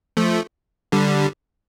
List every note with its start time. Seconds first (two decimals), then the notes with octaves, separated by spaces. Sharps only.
0.17 F3 A3
0.92 D3 G3